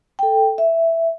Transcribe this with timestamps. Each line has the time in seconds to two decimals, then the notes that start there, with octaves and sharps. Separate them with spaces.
0.19 A4 G5
0.58 E5